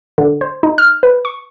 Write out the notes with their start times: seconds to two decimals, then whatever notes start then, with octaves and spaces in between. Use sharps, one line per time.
0.18 D3
0.41 C5
0.63 D#4
0.78 F6
1.03 B4
1.25 C#6